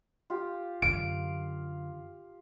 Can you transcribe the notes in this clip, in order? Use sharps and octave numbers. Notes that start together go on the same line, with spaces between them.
F4 G4
F#2 D3 F5 D7